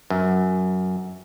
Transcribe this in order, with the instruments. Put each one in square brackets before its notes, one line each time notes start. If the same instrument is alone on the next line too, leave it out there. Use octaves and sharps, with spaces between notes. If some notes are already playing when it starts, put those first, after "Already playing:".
[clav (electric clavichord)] F#2